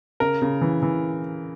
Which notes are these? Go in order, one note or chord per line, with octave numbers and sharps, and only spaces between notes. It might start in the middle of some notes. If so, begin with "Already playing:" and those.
C#3 A#4
C#3
E3
E3